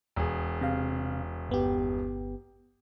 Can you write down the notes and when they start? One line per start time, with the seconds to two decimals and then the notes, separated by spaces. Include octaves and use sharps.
0.16 E1 G#4
0.61 C3 F5
1.49 G1 B3 G4